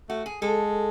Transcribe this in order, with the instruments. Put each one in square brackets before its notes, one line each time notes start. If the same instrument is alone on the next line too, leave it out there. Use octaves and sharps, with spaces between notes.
[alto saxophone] A3 [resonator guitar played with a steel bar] F#4
[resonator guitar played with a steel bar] G#4
[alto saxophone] G#3 [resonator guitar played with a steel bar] A4